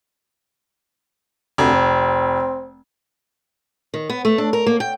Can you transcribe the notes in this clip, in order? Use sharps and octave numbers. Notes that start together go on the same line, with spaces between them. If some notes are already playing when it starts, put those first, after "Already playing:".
F1 D2
C4
D#3
B3
A3
D4
A#4
A#3
G5